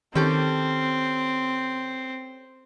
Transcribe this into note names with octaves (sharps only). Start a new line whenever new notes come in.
D#3 C4 C#4 G4 A4